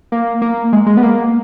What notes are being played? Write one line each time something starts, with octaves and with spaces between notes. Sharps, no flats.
A#3
A#3
G#3
G#3
B3
A#3